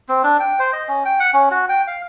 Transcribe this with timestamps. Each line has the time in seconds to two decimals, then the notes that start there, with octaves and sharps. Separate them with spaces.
0.09 C4
0.24 D4
0.40 G5
0.59 C5
0.73 D#5
0.88 C#4
1.05 G5
1.20 F#5
1.33 C#4
1.51 F#4
1.69 G5
1.87 F5